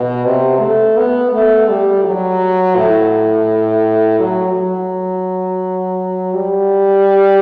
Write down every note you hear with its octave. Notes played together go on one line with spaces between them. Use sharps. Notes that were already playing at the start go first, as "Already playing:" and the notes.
Already playing: B2
C3
A3
B3
A3
G3
F#3
A2
F#3
F#3
G3